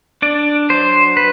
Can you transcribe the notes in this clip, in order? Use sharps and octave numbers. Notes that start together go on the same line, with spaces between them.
D4 D5
F#3 C5
B4